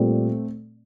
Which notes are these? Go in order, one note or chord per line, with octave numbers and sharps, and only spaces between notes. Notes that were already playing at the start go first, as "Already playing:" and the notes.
Already playing: A#2 G3 A3 C4